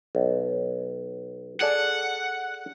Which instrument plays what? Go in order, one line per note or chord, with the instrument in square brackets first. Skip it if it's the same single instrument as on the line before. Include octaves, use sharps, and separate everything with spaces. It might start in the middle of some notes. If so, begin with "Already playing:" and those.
[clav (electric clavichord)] B1
[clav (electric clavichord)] G#4 A4 D5 [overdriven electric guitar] F#5